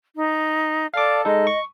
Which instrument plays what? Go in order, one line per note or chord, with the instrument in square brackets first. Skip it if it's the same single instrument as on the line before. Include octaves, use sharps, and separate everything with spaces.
[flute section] D#4
[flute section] A4 D5 A5 [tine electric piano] F5 D6
[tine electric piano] G#3 D#4 A4 [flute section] D#5
[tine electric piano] C#6